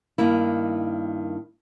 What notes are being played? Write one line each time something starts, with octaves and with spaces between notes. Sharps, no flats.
G2 D#3 A#3 E4